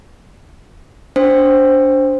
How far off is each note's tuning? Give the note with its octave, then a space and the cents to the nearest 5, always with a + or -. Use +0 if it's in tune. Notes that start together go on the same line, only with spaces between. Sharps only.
D4 -25 C5 +0